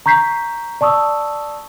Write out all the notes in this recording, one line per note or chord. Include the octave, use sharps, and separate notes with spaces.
A#5 C#6 G6 B6 C7
D5 A5 C#6 D#6 E6